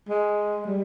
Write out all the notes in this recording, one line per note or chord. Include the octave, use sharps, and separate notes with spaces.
G#3
G3